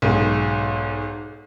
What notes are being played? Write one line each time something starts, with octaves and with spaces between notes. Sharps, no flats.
B1 G#2